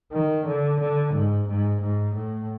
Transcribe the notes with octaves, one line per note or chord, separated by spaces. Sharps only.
D#3
D3
D3
G#2
G#2
G#2
A2